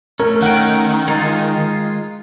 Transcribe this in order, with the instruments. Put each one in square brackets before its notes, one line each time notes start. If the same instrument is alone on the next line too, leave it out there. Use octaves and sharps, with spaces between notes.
[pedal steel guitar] A3 C#4 [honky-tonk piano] A#4
[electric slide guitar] D#3 [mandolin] F#5 G5
[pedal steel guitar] G#3 F4 [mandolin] D#4